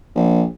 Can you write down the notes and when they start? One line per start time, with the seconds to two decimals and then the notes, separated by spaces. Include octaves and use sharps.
0.15 A#1